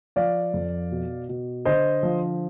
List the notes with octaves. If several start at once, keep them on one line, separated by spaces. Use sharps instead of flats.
F3 D5 F5
F2
B2
B2
D3 C5 D#5
F3